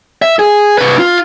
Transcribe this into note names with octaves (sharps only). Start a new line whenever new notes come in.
E5
G#4
C3 B4
F4